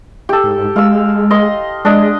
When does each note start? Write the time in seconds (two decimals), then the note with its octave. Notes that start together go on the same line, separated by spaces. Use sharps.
0.29 G4 A4
0.44 G#2
0.76 G#3 F5 E6
1.30 D#5 C6
1.85 G#3 D4 D#5